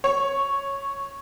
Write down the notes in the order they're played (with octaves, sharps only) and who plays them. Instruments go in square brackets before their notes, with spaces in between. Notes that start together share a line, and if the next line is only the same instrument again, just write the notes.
[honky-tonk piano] C#5